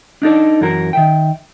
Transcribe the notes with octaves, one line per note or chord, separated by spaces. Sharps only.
D4 D#4 A4 D5
F#2 E3 F#4 A#4 A#5
D#3 E5 G5